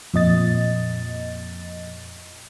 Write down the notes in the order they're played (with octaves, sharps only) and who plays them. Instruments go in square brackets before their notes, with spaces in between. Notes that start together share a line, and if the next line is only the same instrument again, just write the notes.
[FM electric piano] F2 A#2 D#5 A6